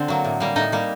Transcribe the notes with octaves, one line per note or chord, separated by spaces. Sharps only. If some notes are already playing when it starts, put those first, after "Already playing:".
Already playing: D3 C4 C5
F#3 A#3
A2
G3 A#3
A2 D#4 D#5
G3 A#3